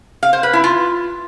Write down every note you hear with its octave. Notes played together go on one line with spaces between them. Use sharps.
F5
C5
B4
E4
F4